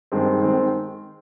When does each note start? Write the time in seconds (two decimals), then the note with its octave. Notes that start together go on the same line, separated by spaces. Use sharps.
0.12 G2 D#3 G#3 C4
0.42 D#3 G#3 C4